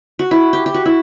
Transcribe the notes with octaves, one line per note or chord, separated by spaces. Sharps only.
F#4
E4
G4
G4
F#4
E4